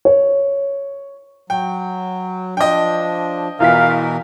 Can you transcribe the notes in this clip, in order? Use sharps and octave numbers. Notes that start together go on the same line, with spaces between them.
C#5
F#3 G5
F3 D4 D#5 G5
E2 B2 E3 F4 A#4 F5 B6